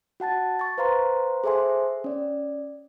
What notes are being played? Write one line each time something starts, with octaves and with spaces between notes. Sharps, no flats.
F#4 F#5 A5 A6
C#6 A6
B4 C5 F5 A#5 C6
G#4 A4 C5 E5 G#5 C6
C#4 D5